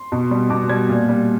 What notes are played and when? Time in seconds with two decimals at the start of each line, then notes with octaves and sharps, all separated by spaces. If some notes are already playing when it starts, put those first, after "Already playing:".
Already playing: C6
0.12 B2
0.31 G3
0.50 B2 D6
0.69 G3 G#6
0.89 A#2
1.09 G3